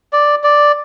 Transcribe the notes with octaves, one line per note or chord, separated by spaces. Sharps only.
D5
D5